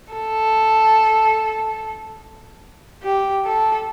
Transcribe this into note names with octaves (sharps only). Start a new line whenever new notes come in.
A4
G4
A4